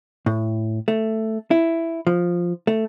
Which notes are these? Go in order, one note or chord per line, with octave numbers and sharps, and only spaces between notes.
A2
A3
E4
F3
A3